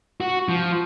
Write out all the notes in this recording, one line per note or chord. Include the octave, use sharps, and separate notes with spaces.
F#4
F3